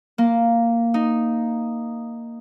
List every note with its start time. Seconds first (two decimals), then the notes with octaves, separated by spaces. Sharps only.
0.18 A#3
0.94 D#4